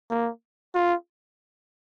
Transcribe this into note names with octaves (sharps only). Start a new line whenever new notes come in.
A#3
F4